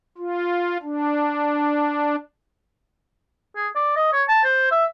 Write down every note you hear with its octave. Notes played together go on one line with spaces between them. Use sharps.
F4
D4
G#4
D5
D#5
C#5
A5
C5
E5